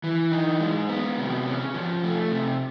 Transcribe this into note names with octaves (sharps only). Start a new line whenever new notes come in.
E3
D#4
G#3
B3
C3
C#4
F3
A3
C3